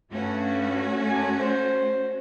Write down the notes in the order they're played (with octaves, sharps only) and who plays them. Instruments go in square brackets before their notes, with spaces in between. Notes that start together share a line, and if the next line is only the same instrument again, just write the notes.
[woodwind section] G2 [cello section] A3 C#4 F#4
[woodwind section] F#2 D4 G#5
C5